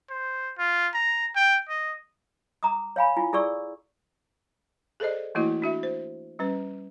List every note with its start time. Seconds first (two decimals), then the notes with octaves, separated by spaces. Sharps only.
0.10 C5
0.58 F4
0.94 A#5
1.36 G5
1.69 D#5
2.63 A#5 D6 D#6
2.96 C#5 F5 G#5 B5
3.17 E4 F4 G#5
3.32 E4 G#4 A4 D5 C#6 E6
5.00 G#4 A4 C5 D5 D#5
5.35 E3 A3 A#3 E4 F#4 D#5
5.62 D4 F#4 E5
5.83 C5
6.39 G3 C#4 B4